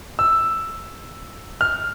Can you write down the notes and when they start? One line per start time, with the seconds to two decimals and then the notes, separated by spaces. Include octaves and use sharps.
0.19 E6
1.61 F6